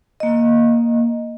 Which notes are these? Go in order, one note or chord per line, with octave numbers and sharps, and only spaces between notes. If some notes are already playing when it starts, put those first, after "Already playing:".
A#3 D#5